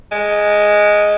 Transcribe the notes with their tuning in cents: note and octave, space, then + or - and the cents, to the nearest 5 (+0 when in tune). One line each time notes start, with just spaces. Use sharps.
G#3 +0